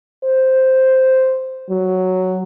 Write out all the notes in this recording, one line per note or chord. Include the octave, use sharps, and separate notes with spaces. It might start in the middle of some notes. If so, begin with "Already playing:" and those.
C5
F#3